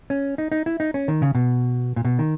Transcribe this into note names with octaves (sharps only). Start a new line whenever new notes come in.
C#4
D#4
D#4
E4
D#4
C#4
D#3
C#3
B2
A#2
B2
D#3